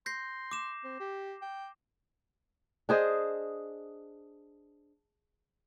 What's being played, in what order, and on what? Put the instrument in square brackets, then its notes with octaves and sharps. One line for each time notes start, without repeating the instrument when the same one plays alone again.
[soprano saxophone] C6 [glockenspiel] G6 A#6 C7
[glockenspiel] D6 E7
[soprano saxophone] C4
G4
G5
[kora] D4 G#4 C5 D#5